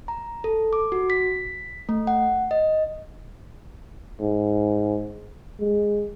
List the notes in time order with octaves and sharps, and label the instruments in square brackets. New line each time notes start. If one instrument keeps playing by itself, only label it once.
[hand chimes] A#5
A4
D6
F#4
B6
A3
F#5
D#5
[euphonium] G#2
G#3